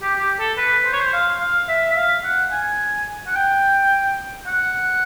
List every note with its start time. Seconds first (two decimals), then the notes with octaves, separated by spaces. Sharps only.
0.02 G4
0.20 G4
0.39 A4
0.57 B4
0.85 C5
0.93 C#5
1.00 C5
1.13 F5
1.40 F5
1.68 E5
1.91 E5
1.97 F5
2.24 F#5
2.52 G#5
3.27 F#5
3.36 G5
4.47 F#5